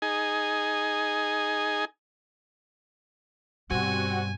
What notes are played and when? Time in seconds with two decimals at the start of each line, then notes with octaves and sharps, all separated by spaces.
0.02 D#4 G#4 G#5
3.70 G2 B2 G3 C4 F#4 F#5 G#5